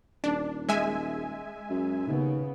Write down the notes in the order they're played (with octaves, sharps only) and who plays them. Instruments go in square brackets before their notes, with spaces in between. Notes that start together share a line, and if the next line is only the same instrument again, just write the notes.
[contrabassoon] D#1 [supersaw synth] D4
[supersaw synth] G#3 E5 G#5
[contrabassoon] F#2
[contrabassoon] D#2 [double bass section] C#3 B3